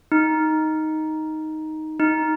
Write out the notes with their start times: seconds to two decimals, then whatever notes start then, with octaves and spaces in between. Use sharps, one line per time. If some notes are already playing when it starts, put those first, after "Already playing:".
0.12 D#4
2.00 D#4